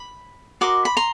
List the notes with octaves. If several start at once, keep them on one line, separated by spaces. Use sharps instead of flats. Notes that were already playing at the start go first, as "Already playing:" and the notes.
Already playing: B5
F#4 A#4 D#5 C6 D6
B5
A#5 C6